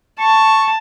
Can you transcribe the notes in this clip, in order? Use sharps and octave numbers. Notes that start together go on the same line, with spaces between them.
A5 C#6